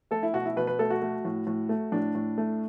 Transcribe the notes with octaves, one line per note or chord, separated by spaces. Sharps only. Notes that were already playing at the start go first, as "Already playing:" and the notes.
A3 A4
E4
B2 F#4
E4
B2 B4
B4
A3 A4
F#4
A3
A2
A2
A3
A2 D4
A2
A3